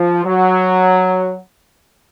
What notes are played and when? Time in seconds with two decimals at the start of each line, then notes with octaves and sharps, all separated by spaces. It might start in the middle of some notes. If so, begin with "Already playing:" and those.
Already playing: F3
0.25 F#3